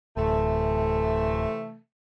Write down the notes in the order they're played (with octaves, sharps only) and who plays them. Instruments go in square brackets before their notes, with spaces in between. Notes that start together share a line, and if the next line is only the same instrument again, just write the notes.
[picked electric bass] D1 [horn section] C3 E3 A3